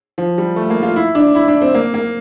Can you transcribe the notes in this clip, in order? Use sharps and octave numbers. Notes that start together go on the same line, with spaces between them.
F3
G3
A3
A#3
F4
E4
D4
E4
D4
C4
A#3
A#3